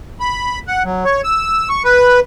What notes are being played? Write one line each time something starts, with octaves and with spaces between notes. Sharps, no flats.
B5
F#5
F#3
C#5
E6
C#6
B4